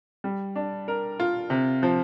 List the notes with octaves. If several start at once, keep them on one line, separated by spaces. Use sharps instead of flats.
G3
D4
A#4
F4
C3
F3